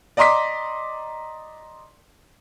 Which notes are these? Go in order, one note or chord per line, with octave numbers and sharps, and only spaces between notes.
D5 D#5 A#5 C6 D6 B6